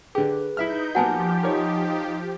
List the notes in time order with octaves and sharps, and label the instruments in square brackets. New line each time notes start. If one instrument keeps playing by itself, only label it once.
[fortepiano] D3 G4 [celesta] G#4 [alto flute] B4
[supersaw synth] D#4 G6 [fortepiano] E4 E5 F6
[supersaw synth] F3 G4 [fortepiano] F#3 A#3 B3 [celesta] F#5 G#5 A5
[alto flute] D#4 [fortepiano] A#4 C#5